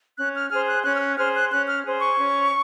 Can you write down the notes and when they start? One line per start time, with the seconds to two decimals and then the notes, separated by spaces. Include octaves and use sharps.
0.18 C#4 F#6
0.35 F6
0.51 G#4 C5 F6
0.68 F#6
0.85 C#4 F#6
0.96 F6
1.01 F#6
1.18 G#4 C5 F6
1.35 F#6
1.51 C#4 F#6
1.68 F6
1.85 G#4 C5
2.01 C#6
2.17 C#4